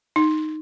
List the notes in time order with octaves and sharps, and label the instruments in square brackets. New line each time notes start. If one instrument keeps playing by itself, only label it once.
[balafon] D#4